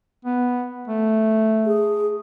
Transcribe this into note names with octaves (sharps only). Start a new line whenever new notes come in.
B3
A3
G#4